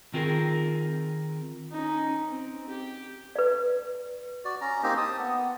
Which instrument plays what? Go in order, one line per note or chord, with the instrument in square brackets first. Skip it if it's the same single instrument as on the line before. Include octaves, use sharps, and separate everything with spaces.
[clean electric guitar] D#3 C4 F4 G#4 A#4
[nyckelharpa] C#4 D#4
C4
G4
[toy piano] B4 D5
[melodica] F#4 D5
C#4 A#5
A#3 C4 D#4 G4
A5 D#6
B3